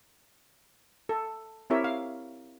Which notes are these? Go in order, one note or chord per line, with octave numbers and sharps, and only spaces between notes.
A4
C4 E4 G4 A#4 C#5 E5
F5